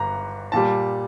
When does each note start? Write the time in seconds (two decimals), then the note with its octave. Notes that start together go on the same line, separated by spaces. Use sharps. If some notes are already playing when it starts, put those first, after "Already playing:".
Already playing: G1 G2 A#5
0.52 A#2 G3 A5